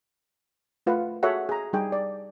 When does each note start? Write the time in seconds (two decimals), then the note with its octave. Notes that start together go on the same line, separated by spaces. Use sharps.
0.86 A3 F4 B4 F#5
1.23 F#4 G#4 A4 C#5 E5 F#5
1.49 G#4 A#5
1.73 G3 D#4 G#4 G5
1.92 D5